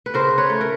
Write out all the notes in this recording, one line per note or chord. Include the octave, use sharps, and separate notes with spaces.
B4
C#3 A#4 C5
B4 C#5
A3
A#4